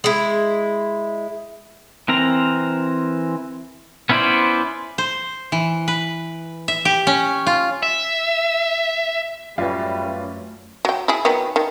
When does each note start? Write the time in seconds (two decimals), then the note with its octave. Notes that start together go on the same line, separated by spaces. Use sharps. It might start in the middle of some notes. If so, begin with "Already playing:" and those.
0.04 G#3 E4
2.08 E3 C4 A#4 A#5
4.09 B3 C#4 E4 C5 D5
4.98 C5
5.52 E3
5.88 B4
6.68 E5
6.85 G4
7.07 C#4
7.47 F4
7.83 E5
9.58 F#2 A2 G3 C#4 F4 B4
10.85 F#3 G5
11.08 E4 G#4
11.25 D#3 F#3 B3
11.56 D#3